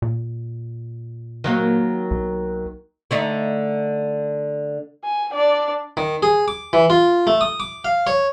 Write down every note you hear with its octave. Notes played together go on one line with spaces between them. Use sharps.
A#2
D#3 F#3 A#3
B1
D3 A3 D#4
G#5
D4 D5
D#3
G#4
D6
E3
F4
A3
D#6
D6
F5
C#5